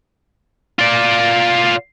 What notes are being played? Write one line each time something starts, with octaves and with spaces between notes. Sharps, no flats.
F4 D5